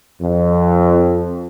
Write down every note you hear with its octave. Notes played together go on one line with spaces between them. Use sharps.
F2